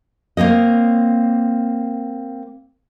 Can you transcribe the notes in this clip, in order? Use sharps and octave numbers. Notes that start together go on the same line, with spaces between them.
A#3 C4 C#5 D#5